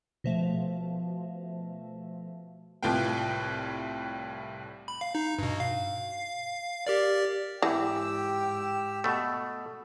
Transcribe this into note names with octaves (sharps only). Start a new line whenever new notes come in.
B2 F3 A3
C2 A2 F4 B4 G5
B5
F5
D#4
G2 B2
F5
G4 A#4 D5
G#2 E3 G4 G5 E6
B2 A3